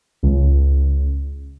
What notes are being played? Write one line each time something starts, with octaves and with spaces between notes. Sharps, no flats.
C#2